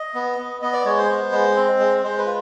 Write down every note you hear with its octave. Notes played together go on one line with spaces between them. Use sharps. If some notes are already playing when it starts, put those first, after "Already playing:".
Already playing: D#5
B3
B3
B3 D#5
D5
G#3 C#5
C5
B3
G#3
C4
G#3
G#3 C5
B4
F4